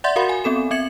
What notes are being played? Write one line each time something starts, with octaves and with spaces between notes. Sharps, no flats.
D5 E5 F#5 C6 G6 A6
F#4 A#4 F5 F#5 B5 C6
G#5
B3 C4 A4 E7
C4 E5 G#6 C#7 F#7